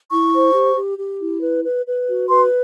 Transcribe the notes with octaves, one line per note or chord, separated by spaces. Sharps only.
E4 C#6
C5
G4
G4
G4
E4
B4
B4
B4
F#4
B4 C6